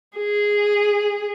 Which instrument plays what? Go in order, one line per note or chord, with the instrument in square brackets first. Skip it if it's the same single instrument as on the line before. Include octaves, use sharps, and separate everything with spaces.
[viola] G#4